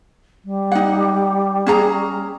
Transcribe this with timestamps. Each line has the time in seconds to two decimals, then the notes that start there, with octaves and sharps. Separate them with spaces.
0.45 G3
0.72 D#4 F#5
1.66 C#4 G#4 A#5